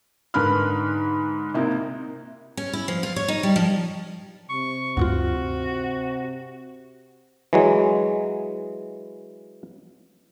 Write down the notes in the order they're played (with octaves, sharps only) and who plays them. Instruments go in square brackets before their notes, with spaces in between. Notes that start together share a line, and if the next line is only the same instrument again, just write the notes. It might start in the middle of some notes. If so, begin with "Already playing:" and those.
[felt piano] G#2 D3 A#4 B4 B5 F6
C3 A#3 D#4 E4
[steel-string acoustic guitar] C#4
E4
F3
F4
C#5
D#4
G3
F3
[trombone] C3 [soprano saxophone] C#6
[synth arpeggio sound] D2 G2 F4 [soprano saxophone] F#4
[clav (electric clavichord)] E3 F#3 G#3